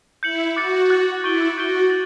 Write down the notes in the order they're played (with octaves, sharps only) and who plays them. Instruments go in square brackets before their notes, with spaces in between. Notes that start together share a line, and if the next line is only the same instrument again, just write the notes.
[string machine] E4 [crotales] G6 C#7 F#7
[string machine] F#4 [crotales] D6 F#6 A6 C#7
[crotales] D6 F#6 A6 C#7
[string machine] E4 [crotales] C#6 G6 D7 G7
[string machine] F#4 [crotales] C#6 G6 D7 G7
[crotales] A6 F#7